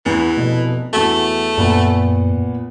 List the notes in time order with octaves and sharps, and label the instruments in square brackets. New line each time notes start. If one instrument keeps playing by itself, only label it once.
[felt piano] E2 [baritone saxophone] E3
[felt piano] F1 B2
[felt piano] E2 F#4 [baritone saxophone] A3
[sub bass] F#2 [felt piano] A#2 B3 F#5